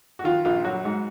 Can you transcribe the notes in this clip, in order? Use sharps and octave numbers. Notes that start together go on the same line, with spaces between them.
F#4
D#3 F4
A#1 F4
F#3 F#4
G#2